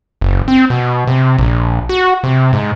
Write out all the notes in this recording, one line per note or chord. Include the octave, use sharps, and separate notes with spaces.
F#1
C4
B2
C3
A#1
F#4
C3
G#2